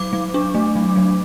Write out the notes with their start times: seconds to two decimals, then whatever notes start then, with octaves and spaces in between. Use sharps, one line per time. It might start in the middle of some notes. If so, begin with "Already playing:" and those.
Already playing: F#3 D6
0.13 F#3
0.34 D4
0.54 A3
0.75 F#3
0.96 F#3